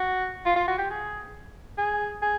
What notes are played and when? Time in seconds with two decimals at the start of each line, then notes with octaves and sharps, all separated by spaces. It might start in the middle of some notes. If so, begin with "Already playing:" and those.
Already playing: F#4
0.46 F4
0.56 F4
0.68 F#4
0.78 G4
0.90 G#4
1.78 G#4
2.22 G#4